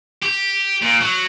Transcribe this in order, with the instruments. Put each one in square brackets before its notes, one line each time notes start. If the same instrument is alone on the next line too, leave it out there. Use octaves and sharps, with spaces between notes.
[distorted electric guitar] G4
A#2
F#3